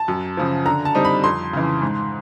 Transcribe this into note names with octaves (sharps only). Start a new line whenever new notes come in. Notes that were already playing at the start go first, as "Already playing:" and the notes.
Already playing: A5
F#2
C#3 F3
D3 A#5
A5
G3 C4 D#4
B5
F2 C6
C#3 E3
G#2